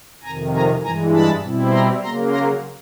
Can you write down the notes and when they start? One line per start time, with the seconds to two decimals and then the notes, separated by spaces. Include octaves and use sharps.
0.22 F2 C3 D#3 G#5 A#5
0.52 G#5 A#5
0.81 G2 E3 G#3 G#5 A#5
1.12 A5 B5
1.41 B2 G3 C4 E4
1.70 A#5 C6
2.00 C#3 F#3 A#3 A#5 C6
2.30 A#5 C6